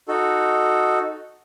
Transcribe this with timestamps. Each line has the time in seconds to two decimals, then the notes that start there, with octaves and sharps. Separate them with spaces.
0.08 D#4 F#4 A4